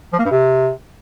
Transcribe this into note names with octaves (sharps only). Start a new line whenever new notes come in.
F3
A#3
G2
C3